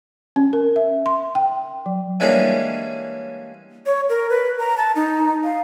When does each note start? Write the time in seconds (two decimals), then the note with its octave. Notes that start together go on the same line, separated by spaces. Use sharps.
0.36 C#4
0.53 A#4
0.76 E5
1.06 C6
1.35 G5
1.86 F#3
2.20 E3 G3 G#3 A#3 C#4 D4
3.86 C#5
4.09 A#4
4.30 B4
4.59 A#5
4.77 A5
4.96 D#4
5.44 F5